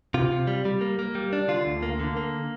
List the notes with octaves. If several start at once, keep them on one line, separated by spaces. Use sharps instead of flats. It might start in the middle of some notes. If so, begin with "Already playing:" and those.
C3 F4
C3
G3
G3
A#3
A#3
G3
D4
D3 F4
D2
A#3
D3
A#3